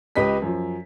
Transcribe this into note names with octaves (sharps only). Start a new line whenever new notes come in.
C#2 G4 B4 D#5 B6
F#2 F3